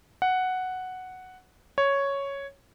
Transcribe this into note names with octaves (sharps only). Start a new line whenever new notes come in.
F#5
C#5